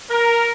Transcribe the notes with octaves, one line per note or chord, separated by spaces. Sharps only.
A#4